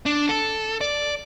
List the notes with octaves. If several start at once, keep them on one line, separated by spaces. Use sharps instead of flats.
D4
A4
D5